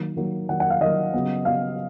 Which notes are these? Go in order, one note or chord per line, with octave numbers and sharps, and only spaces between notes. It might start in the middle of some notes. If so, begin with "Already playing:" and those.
Already playing: D#3 F#3 A#3
D#3 F#3 A#3
D#3 F#3 A#3 F#5
F#5
F5
D#3 F#3 A#3 D#5
C#3 F#3 B3
C#3 F#3 B3 F5